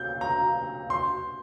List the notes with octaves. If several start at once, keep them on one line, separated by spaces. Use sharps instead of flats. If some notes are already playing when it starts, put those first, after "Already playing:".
Already playing: G6
A#5
C6